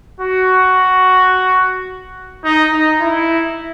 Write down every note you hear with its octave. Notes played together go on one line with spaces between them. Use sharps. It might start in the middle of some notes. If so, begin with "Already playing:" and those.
F#4
D#4
D#4
E4